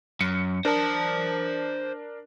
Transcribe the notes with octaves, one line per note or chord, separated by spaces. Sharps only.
F#2 C#7
D4 A#4 C5 A5